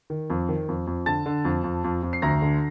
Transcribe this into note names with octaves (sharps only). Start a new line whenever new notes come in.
D#3
F2
D#3
F2
F2
D3 A5 A6
D3
F2
F2
F2
F2
C7
D2 A#5 A#6
D3